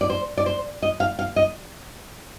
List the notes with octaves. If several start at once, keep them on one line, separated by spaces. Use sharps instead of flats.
D5
C5
D5
C5
D#5
F5
F5
D#5